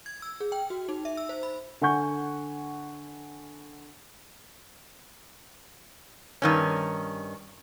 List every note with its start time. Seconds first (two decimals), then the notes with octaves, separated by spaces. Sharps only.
0.06 G#6
0.22 E6
0.40 G#4
0.52 G5
0.70 F#4
0.89 D#4
1.05 E5
1.17 E6
1.29 C5
1.43 B5
1.81 D3 F#5 G#5 C#6 G6
6.42 G2 D#3 C#4